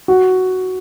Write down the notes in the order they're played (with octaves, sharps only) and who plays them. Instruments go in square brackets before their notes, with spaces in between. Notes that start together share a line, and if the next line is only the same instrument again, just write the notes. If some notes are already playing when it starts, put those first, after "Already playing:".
[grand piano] F#4